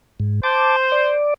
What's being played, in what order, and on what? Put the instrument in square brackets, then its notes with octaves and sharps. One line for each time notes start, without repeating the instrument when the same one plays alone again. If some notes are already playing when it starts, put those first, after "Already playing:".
[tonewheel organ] G#2
[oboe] C5 [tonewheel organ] A5 D6
[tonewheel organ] D5